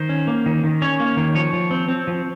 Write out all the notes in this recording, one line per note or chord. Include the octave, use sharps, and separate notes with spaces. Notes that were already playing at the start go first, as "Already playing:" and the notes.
Already playing: D#3 C5
C#4
A#3
D#3
D#3
C#4 C#5
A#3
D#3
F3 C#5
F3
C4
C4
F3